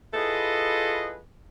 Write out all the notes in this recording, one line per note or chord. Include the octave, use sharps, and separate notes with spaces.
E4 F4 G#4 A4 B4 D#5